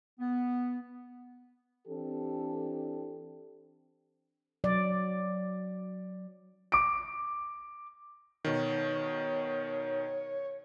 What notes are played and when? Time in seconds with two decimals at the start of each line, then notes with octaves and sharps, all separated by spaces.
0.19 B3
1.87 E3 C4 D4 G4 A4
4.64 F#3 D5
6.72 D6 D7
8.45 B2 D#3 C#5